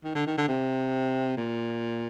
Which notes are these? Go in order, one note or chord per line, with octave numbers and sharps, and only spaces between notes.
D#3
D3
D#3
D3
C3
A#2